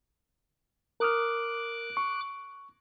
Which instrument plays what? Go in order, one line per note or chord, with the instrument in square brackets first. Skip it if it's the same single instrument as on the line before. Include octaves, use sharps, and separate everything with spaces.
[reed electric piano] A#4 D#6 F6 [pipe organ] D6 F#6
[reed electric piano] C#6